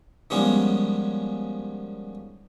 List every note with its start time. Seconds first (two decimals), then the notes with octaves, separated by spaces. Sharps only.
0.30 D#3 F3 G3 G#3 B3 C#4